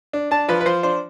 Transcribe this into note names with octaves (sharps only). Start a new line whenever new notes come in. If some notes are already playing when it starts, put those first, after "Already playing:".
D4
D4 A5
F3 B4
B4
F3 C5
D4 C5